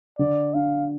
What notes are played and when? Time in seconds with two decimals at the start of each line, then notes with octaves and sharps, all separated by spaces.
0.19 D3 D5
0.54 D4 F5